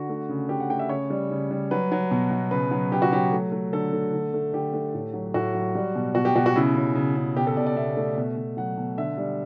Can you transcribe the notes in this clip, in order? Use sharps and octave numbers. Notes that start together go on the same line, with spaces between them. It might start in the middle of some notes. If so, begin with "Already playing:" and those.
Already playing: D3 F#4
A3
C#3
C#3 G4
F#5
A3 G5
E5
C#3 C#5
G3
C#3
G3
F#3 B4
F#3
B2
B2
C#3 B4
F#3
C#3 G4
F#4
F#3 G4
A3
A3
D3 A4
A3
D3
A3
D3 G4
A3
A2
F#3
A2 F#4
F#3
G3
B2
B2 F#4
G4
B2 F#4
F#4
C#3 E4
C#3
C#3
C#3
B2 G4
A4
B2 D5
D5
B2 E5
A3
B2
B2
F#3 F#5
B2
D3 E5
G3